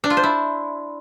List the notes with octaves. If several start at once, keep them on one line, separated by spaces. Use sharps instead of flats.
D4
F4
C5
E4